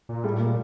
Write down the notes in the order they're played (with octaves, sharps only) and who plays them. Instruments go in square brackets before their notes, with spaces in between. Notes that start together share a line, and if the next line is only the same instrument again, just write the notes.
[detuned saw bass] A#2
[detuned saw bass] A2 [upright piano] G3 A3
[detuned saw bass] A#2